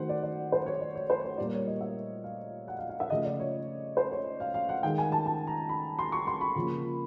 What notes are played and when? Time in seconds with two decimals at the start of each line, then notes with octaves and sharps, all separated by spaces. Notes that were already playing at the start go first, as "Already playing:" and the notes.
Already playing: D#3 F#3 A3 C5 F#5
0.09 D5
0.23 D5
0.52 C5
0.66 C#5
0.81 D5
0.96 C#5
1.10 C5
1.24 C#5
1.37 A#2 G3 A#3 D5
1.53 C#5
1.67 D#5
1.81 E5
2.24 F5
2.68 F#5
2.78 F5
2.89 F5
3.00 E5
3.10 C#3 F3 A3 D#5
3.25 D5
3.40 C#5
3.97 C5
4.11 C#5
4.40 F5
4.54 F5
4.69 F#5
4.83 D#3 G5
4.86 G#3
4.98 G#5
5.12 A5
5.26 A5
5.47 A#5
5.69 B5
5.99 C6
6.12 C#6
6.27 C6
6.41 B5
6.56 C#3 F3 A#3